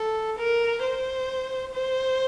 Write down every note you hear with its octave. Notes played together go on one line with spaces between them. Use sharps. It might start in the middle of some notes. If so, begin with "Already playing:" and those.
Already playing: A4
A#4
C5
C5